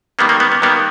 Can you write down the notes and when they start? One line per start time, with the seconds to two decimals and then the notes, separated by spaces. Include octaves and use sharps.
0.19 D#3 G3 A#3 B3
0.29 A#3
0.40 B3
0.52 B3
0.62 D#3 G3 A#3 B3